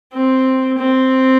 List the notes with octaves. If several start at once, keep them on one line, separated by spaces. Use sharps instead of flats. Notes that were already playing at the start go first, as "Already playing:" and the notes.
C4
C4